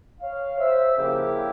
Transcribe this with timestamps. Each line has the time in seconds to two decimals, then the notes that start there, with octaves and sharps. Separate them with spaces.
0.21 C#5 F5
0.59 C5 E5
0.97 C#3 F3 A#3 E4 G4